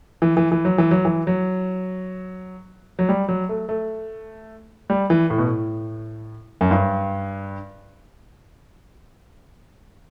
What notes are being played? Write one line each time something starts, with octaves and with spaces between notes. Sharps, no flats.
E3
E3
E3
F#3
E3
F#3
E3
F#3
F#3
G3
F#3
A3
A3
G3
E3
A2
B2
A2
F#2
G2